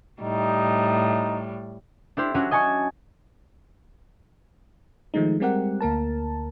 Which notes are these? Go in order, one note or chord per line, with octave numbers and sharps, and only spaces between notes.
A2 G3 D#4
D4 E4 G4 C5
F#3 C#4 D4 F#4
D#5 G#5 A5 C#6
D#3 F3 G#3 A3 D#4
G3 G#3 C4 G4 A#4 F#5
D2 A#3 A#4 A5